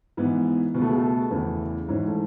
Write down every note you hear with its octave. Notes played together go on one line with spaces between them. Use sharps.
G#2 E3 B3
C#2 B2 A3 B3
G#3
A3
E2 C#3 E3
G#2 E3 C#4
A3